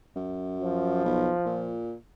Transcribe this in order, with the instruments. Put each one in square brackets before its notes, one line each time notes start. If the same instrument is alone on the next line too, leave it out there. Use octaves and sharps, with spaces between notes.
[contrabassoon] F#2
[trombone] F3
[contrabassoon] B1
A#2